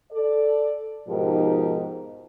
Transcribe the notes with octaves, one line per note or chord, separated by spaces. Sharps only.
A4 D5
G#2 B2 F3 D#4 G4 A#4